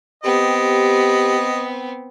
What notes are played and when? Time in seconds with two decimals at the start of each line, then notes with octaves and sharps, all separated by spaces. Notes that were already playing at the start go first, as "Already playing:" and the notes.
0.24 B3 C4 G4 D#5